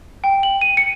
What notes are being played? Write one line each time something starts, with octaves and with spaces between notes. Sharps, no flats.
G5
F#7
D#7
C#7